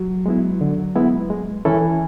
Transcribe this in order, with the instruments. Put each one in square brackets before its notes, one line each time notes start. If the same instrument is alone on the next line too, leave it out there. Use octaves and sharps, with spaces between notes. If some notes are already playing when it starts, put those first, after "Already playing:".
Already playing: [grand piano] F#3
[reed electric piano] G#3 B3 E4
D3
G#3 B3 E4
G#3
[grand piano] E3 [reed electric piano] C#4 E4 A4